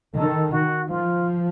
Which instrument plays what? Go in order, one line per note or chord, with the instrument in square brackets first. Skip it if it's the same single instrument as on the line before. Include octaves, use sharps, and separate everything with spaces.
[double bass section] D#3 [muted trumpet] A4
[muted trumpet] F#4
[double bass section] F3 [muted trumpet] F4